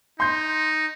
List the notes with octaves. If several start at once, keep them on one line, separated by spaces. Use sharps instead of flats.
D#4 C6 G6